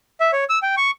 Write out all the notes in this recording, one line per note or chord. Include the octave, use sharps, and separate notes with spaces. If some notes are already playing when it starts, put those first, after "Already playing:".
E5
C#5
E6
G5
C#6